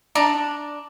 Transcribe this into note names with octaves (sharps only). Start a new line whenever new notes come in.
D4 D5 A#5